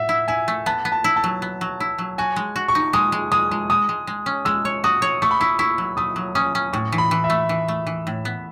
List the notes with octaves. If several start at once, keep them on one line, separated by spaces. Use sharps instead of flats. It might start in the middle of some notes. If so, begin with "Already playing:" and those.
Already playing: A2 E5 F#5
E4
E4 G#5
A3
B3 A5
B3
A5
E4
A5
F#3
B3
F#3
E4
F#3
F#4 G#5
G#3
F#4
C#6
D#4
G#3 D#6
G#3
G#3 D#6
G#3
G#3 D#6
G#3
G#3
C#4
G#3 E6
C#5
F#4 D#6
C#5
A3 C#6
B5
E4 C#6
E4 C#6
F#3
A3 D#6
F#3
C#4 D#6
C#4
A2 C#6
E3
B5
E3
E5
A3
E3
A3
E3
A2
B3